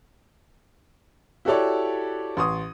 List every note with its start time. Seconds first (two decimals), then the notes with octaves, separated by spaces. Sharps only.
1.45 E4 F#4 G4 A4 C#5 D5
2.37 A1 C6 C#6 D#6